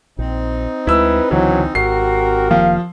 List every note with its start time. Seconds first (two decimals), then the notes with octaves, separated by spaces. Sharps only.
0.18 A#1 C4 D#4
0.87 D2 G#3 E4 B4 E6
1.31 C#2 D3 E3 F#3
1.75 G#1 C4 F#4 G4 A#4 C7
2.51 F1 D#3 F3 A#3 F5